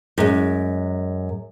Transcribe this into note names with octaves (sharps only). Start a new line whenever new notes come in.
F#2 G#3